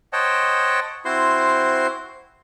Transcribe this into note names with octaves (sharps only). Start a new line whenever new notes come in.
C5 C#5 D#5 F#5 G5 A5
C4 E4 F#4 C5 C6